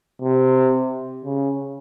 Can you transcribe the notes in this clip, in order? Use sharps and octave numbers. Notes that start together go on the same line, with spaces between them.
C3
C#3